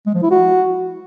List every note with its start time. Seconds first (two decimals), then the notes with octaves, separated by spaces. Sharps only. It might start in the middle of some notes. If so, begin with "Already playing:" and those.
0.06 G#3
0.15 F3
0.23 E4
0.31 F#4